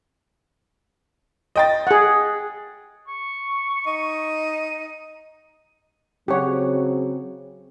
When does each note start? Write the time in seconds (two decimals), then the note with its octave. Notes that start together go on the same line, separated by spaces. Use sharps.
1.56 D#5 G5 A6
1.87 G#4 F#5
3.08 C#6
3.86 D#4
6.28 C#3 F#3 C4 G4 C#5 F#5